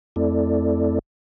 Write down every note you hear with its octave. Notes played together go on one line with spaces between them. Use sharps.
F2 A3 C4 E4 A4 D5